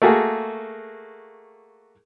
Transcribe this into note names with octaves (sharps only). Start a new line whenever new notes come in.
A3 A#3 F#4 G#4